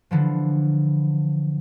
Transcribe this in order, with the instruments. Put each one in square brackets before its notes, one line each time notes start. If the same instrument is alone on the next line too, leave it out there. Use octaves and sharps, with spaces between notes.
[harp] D3 E3 F3